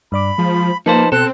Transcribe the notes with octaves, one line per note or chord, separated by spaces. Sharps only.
G2 D5 B5 D6
F3 G#3
F3 A#3 D#4 B4 C5 A5
B2 C4 A4 F#6